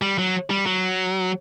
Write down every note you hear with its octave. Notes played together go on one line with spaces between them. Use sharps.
G3
F#3
G3
F#3